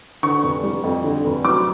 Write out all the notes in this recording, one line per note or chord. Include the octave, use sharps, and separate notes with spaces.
D3 C#6
F1
G3
F2
D3
F1
F#3 D6